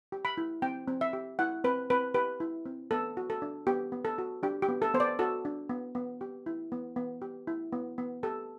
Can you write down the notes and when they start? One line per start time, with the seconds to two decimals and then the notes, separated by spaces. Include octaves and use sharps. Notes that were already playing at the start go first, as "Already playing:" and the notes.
0.12 G4
0.25 B5
0.38 E4
0.62 C4 G5
0.88 C4
1.01 E5
1.13 G4
1.39 E4 F#5
1.64 C4 B4
1.90 C4 B4
2.14 G4 B4
2.40 E4
2.66 C4
2.91 B3 A4
3.17 F#4
3.30 A4
3.42 D4
3.67 B3 G4
3.92 B3
4.05 A4
4.18 F#4
4.43 D4 G4
4.62 G4
4.68 B3
4.82 A4
4.94 B3 C5
5.00 D5
5.19 F#4 A4
5.45 D4
5.69 B3
5.95 B3
6.21 G4
6.46 E4
6.72 B3
6.96 B3
7.22 G4
7.47 E4
7.73 B3
7.98 B3
8.23 G4 A4